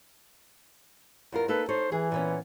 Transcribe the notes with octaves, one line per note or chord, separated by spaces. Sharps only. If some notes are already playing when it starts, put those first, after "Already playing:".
E2 F4 A#4
A#3 D#4 A4 B4
D#4 A4 C5 C#5
E3 G#4
A#2 B3 C#4